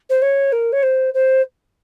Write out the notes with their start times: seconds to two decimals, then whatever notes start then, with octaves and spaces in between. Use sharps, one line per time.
0.10 C5
0.22 C#5
0.52 A#4
0.72 C#5
0.83 C5
1.14 C5